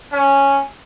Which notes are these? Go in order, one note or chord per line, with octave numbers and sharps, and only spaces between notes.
C#4